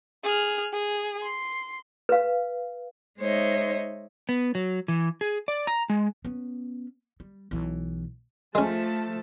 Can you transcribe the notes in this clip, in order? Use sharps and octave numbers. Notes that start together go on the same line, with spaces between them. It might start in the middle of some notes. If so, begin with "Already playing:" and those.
G#4 F6
G#4
C6
B4 F5
G#3 D#4 C5 C#5 D#5 E5
B3
F#3
E3
G#4
D5
A#5
G#3
B3 C#4
G3
B1 E3
F3 G#3 A3 C#4 A5